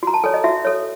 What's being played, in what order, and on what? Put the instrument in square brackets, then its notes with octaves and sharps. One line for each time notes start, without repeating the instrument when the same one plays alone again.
[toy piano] F#4 A#5
A5
A4 C#5 G#5
D#5
F#4 E5
A4 C#5